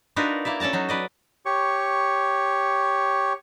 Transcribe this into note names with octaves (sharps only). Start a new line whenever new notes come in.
D4 D#4 F4 F#4 A#4 B4
A#3 E4 D5 E5
C#4 A4 D5 A5 A#5
F#3 D#4 F#4
B4 D5 D#5
G4 C#5 C#6